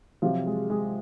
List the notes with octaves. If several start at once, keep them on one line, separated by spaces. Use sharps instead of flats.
C3 F3 F#3 F4
G#3 G#4
G#3 G#4